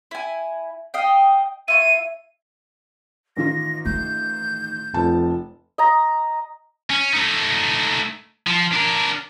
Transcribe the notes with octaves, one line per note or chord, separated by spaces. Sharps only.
E4 G#5
D#5 F5 G5
E4 F4 C#6 D#7
A1 D#3 F4 A#6
A3 G6
F1 F2 A5
D#5 A#5
C#4
A3 D#4
F3
D4 A#4